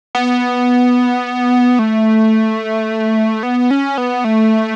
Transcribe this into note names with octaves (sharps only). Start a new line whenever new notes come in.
B3
A3
B3
C#4
B3
A3